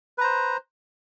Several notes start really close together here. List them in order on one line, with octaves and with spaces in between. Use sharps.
B4 A#5 C5